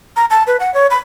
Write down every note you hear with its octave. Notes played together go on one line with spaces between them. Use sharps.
A#5
A5
B4
F#5
C#5
B5